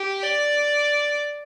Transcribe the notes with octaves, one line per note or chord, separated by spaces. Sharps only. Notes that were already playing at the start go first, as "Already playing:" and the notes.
Already playing: G4
D5